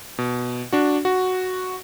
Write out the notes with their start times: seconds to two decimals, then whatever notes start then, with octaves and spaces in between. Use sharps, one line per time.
0.18 B2
0.73 D4 F#4
1.05 F#4